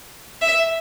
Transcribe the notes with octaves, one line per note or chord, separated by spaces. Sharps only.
E5